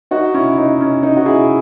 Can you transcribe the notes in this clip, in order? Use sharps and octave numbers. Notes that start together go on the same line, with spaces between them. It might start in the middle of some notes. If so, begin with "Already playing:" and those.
D#4 F#4
C#4 E4
D#4
C#4
D#4
F#4
E4 G#4